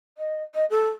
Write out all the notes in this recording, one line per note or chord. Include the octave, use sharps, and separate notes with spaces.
D#5
D#5
A4